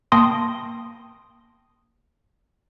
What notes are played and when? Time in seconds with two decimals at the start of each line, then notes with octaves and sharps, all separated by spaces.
0.12 A#3 G5 A5 C6 D#6 A#6